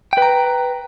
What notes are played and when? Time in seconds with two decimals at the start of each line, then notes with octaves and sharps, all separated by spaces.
0.13 G5
0.18 B4
0.22 A#5